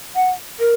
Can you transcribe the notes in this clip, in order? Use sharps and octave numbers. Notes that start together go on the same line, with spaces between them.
F#5
A#4